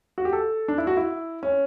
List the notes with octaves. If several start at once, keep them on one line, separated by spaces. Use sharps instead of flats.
F#4
G4
A4
D4
E4
F#4
E4
C#4